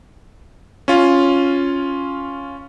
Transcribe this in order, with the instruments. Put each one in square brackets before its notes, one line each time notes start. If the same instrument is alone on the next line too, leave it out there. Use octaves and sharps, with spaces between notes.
[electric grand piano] C#4 F4